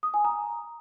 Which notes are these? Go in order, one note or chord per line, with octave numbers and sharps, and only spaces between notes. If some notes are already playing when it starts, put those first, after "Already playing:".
D#6
G#5
A#5